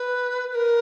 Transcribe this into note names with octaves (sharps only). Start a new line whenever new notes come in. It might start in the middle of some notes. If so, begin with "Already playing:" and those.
Already playing: B4
B4
A#4